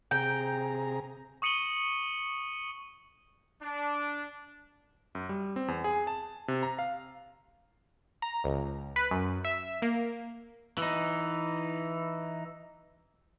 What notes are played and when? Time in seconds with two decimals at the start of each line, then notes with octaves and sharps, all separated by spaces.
0.11 C3 G#4 G5 A#5
1.42 C#6 D#6 C#7 D#7 F#7 G7
3.62 D4
5.15 F#2
5.29 G3
5.56 C4
5.68 E2
5.84 G#4
6.07 A5
6.48 C3
6.63 A#5
6.79 F5
8.22 A#5
8.44 C#2
8.96 B4
9.11 F#2
9.45 E5
9.82 A#3
10.78 E3 D#4